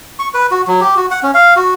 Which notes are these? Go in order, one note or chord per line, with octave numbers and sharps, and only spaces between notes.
C#6
B4
F#4
F#3
G4
F#4
F#5
C#4
F5
F#4